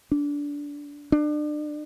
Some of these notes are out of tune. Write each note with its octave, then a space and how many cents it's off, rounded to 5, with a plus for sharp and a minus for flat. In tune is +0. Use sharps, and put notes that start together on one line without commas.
D4 -20
D4 +35